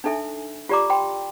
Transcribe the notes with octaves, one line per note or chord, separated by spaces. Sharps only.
D4 D#4 A4 E5 G#5
F4 G4 D5 A#5 D6
G5 B5 C6